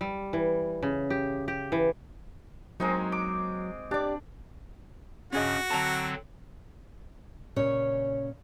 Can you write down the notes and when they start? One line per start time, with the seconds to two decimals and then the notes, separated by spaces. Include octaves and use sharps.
0.01 G3
0.33 E3
0.83 C#3
1.10 G4
1.48 G4
1.72 E3
2.80 F#3 G#3 A#3 C4 D#4
3.12 D6
3.91 D4 G4 D5
5.32 G2 C#3 C#4 F#4 G#4 D#5
5.70 D3 F#3 C4 A5 A#5
7.56 A#2 C#3 C#4 C#5